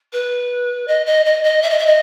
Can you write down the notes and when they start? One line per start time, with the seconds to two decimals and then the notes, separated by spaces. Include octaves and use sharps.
0.13 B4
0.87 D#5
1.06 D#5
1.25 D#5
1.44 D#5
1.62 E5
1.70 D#5
1.78 E5
1.86 D#5